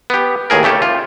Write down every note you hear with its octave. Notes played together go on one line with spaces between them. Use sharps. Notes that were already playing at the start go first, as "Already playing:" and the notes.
B3 G4
D#2 A2 G#4 A#4
C#3 A3 G4 A4
F4